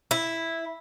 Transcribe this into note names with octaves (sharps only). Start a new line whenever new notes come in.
E4